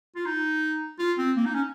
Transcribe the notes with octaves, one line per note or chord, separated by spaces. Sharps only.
F4
D#4
F4
C4
A#3
D#4
C#4